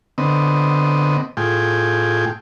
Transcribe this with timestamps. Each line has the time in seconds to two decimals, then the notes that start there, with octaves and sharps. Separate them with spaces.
0.18 D3 B3 C4 D#5
1.37 A2 F4 G#4 G5